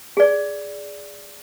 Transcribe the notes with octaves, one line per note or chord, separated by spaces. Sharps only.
G#4 D5